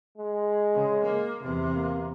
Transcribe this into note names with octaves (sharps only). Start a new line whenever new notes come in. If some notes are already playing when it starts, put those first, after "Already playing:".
G#3
C#3
A#3
E2 C3
A#3